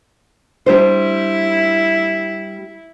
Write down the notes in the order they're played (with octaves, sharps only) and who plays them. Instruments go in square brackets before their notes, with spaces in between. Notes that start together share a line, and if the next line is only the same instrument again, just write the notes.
[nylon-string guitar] G3 D4 C5 [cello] E4